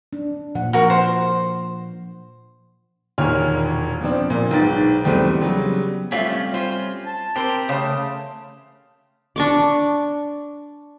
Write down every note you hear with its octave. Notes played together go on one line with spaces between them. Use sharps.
D4
A#2 F3 F#5
F#4 A#4
C5
E1 D#2 A#2 C#5 G#5 F6
F3 B3 C4 D4
A#2
B1 G#2 B4 G5 A6
E2 G3 A3 B3 C4 D#7
C#3 F#3 G3 B3
G3 A3 C4 C#4 F4 E5 F5
F4 C5
A5
C4 G4 A#4 C5
C#3 A3 C#5 F5 A5 C6 D#6
D4 C#6 D6